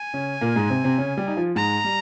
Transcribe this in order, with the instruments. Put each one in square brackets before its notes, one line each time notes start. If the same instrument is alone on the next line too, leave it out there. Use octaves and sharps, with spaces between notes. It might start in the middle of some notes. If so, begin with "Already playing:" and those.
Already playing: [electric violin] G#5
[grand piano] C#3 C#4
A#2 A#3
G#2 G#3
C3 C4
C3 C4
C#3 C#4
G3 G4
D#4
F3 F4
[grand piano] G#2 G#3 [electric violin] A#5
[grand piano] G3